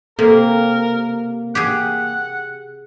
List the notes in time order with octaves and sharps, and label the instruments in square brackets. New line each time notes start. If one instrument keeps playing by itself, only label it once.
[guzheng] C3 [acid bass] A#3 [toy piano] A4 C5 [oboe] A#4
[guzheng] G4 G#4 [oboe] F#5